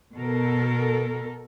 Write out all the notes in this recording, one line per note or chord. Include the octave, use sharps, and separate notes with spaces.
B2 A4 A#4